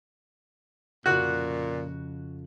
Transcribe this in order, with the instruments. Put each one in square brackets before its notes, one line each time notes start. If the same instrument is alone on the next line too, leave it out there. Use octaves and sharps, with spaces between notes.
[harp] F2 C#3 [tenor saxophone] A#2 [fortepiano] F#4 [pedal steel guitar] F#6